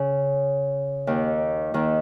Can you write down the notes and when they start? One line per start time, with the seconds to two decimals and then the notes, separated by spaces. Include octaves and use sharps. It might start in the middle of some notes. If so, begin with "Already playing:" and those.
Already playing: C#3
1.07 D#2 D#3
1.74 D#2 D#3